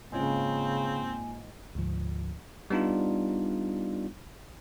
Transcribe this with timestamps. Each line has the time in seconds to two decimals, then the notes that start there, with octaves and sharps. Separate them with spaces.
0.12 G#2 C#3 A#3 C4 C#4 F4 G#5
1.75 D2 G#2 F3
2.70 G3 B3 D4 D#4 F4